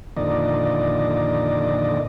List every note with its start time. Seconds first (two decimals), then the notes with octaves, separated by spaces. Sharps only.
0.17 F2 A#2 D3 D#3 D5 D#5